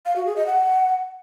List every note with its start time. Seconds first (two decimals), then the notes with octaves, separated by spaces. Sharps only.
0.06 F5
0.16 F#4
0.26 G#4
0.36 D#5
0.46 F#5